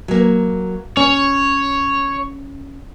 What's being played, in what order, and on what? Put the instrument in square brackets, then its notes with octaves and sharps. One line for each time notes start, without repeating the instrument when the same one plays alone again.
[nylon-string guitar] F#3 A#3
[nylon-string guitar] C#4 [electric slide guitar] C#5